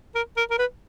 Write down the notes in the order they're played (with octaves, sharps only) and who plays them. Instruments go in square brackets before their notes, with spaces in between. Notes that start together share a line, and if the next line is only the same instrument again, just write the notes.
[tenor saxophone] A#4
A#4
A#4
B4